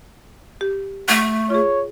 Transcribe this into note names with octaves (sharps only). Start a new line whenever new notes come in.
G4
A3 F#5
F4 G#4 C#5